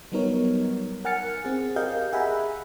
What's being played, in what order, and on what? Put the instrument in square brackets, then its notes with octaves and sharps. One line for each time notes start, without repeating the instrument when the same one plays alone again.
[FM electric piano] F#3 G3 B3 D#4 A#4 C#5
A#4 F#5 G#5 F6 A6 C#7
C4 G#4
G4 A#4 D#5 F5 G6
G#4 E5 F#5 G#5 A#5 B5